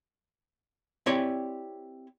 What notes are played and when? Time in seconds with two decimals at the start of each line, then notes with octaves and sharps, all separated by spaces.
1.06 C4 E4 G4 C#5 D5 G#5